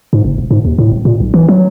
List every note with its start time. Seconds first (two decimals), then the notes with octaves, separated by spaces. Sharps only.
0.13 G#2
0.24 F#1
0.38 E1
0.51 G#2
0.65 D#2
0.78 A2
0.92 D#1
1.05 A#2
1.20 B1
1.34 E3
1.49 F#3